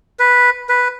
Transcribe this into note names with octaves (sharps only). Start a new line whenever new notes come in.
B4
B4